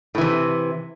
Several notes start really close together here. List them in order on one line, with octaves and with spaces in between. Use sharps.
A2 E3 C3